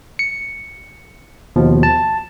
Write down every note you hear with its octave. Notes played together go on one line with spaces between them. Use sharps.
C#7
D#2 B2 F3
A5